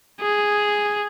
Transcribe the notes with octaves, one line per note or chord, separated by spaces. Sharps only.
G#4